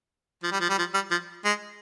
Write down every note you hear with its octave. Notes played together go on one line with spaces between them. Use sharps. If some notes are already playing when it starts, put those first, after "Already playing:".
F3
G3
F3
G3
F3
G3
F3
G#3